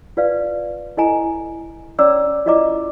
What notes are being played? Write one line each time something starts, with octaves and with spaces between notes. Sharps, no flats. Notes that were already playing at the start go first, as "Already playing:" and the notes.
F4 B4 D5 F5
E4 A4 D#5 G#5 A#5
C#4 C#5 D5 A#5 D6 E6
E4 F4 D5 D#5 A#5 D6